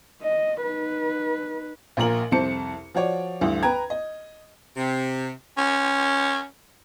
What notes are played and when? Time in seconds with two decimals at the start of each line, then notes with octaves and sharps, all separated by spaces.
0.22 D#5
0.62 D#4 B4
1.97 A#1 A#2 A#4 F#7
2.32 C2 F2 C5 A5 C#7
2.95 F3 F#4 C#5 D5
3.41 D2 G2 D3 E3
3.63 B4 G5 A#5 G#6
3.90 D#5
4.77 C3
5.58 C#4